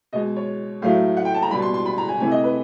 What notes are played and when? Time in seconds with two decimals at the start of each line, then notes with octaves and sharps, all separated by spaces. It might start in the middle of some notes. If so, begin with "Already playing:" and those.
0.13 B2 G#3 D#5
0.36 C#5
0.82 A2 F#3 A3 F5
1.17 F#5
1.25 G5
1.34 A5
1.42 A#5
1.51 G3 B5
1.54 B2
1.62 C6
1.74 C6
1.86 B5
1.98 A#5
2.09 G#5
2.20 C3 E3 A3 G#5
2.32 D#5
2.44 B4